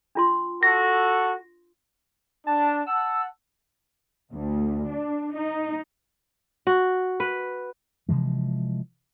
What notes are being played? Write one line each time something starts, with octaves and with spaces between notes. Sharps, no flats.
D4 F4 C6
F#4 A4 A#6
D4 A5
F#5 A5 E6
D2
D4
D#4
F#4
B4
C3 E3 F3 G#3